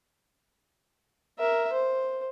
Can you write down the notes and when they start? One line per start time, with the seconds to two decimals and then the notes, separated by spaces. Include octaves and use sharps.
1.39 A#4 E5
1.73 C5